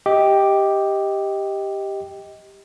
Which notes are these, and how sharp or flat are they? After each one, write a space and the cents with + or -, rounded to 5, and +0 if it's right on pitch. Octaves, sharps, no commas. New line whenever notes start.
G4 +0 D#5 +15